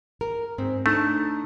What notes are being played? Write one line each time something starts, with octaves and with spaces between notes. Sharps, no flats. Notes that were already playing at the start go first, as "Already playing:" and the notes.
A#4
G#2 C4
A3 D4 D#4 A5